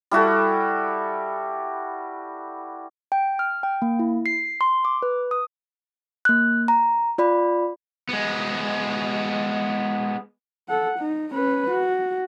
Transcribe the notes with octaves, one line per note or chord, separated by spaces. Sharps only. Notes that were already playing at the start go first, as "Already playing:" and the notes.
G3 E4 F#4 A4
G5
F6
G5
A#3
E4
C7
C6
D6
B4
D#6
A#3 F#6
A#5
F4 D5 B5
G#3 B3
A4 F#5
D#4
C#4 B4
F#4